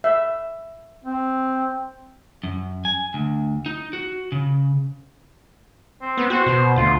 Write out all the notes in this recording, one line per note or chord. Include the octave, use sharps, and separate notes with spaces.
E5
C4
F#2
G#5
D2
D#4
F#4
C#3
C4
B3
F#4 C5
B2
D2 F4